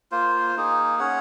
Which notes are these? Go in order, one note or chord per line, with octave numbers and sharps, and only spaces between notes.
A#3 F4 C5
A#3 D#4 G#4
C#4 G#4 C#5 F#5